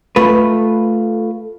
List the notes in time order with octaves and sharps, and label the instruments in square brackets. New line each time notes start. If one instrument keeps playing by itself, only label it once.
[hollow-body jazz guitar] A3 F4 B4